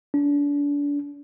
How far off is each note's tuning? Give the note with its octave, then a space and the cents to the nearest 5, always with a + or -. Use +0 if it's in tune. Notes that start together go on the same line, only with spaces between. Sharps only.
D4 -35